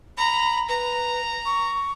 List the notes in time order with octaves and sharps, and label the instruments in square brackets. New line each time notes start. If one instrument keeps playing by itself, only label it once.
[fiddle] A#5 [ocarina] B5
[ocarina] B4 [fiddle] A#5
[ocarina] C#6